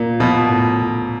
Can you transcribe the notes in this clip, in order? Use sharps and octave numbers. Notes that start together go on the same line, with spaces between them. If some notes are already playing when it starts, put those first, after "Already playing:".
Already playing: A#2 A#3
B2 F3
A2